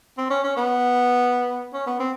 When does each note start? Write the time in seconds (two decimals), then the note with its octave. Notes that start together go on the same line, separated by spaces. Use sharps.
0.18 C4
0.30 C#4
0.44 C#4
0.57 B3
1.74 C#4
1.87 B3
2.00 C4